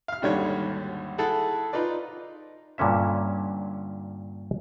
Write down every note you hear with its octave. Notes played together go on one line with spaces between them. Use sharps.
F5 F6
G#1 D#2 D3 G3 F#4 C#5
E4 G#4 A4 F#5 A5
D#4 F4 B4 D5
G2 A#2 D3 C#4 E5